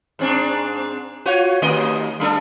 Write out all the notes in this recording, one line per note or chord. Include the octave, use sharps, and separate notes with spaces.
G#2 C4 D4
F4 F#4 C#5
D#2 A3 D#5
G3 D4 A4